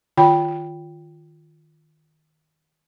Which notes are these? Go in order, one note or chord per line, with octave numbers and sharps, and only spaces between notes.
D#3 F4 G5 B5